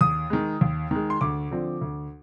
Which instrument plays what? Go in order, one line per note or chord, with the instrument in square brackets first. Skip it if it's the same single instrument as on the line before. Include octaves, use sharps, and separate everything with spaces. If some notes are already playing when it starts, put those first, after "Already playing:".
[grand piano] D#2 D#6
D#3 G#3
D#2
D#3 G#3
C6
D2 D6
D3 F3 C4
D2